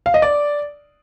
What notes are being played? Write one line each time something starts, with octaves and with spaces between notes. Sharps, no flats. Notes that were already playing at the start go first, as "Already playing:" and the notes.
F5
D#5
D5